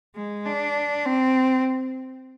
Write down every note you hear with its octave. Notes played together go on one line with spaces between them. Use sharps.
G#3
D4
C4